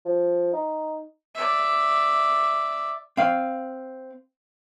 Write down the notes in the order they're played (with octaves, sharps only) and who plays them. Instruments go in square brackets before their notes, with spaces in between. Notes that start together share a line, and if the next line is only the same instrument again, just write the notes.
[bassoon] F3
D#4
[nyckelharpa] D5 E5
[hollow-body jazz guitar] C4 F5